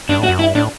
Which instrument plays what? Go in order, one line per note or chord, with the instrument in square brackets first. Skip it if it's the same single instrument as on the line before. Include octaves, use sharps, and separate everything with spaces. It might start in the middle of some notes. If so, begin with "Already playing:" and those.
[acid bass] G2 [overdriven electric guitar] D4
[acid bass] A2 [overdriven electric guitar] F#4
[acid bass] F#2
[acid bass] G2 [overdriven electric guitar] E4
[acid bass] A2 [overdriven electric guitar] D4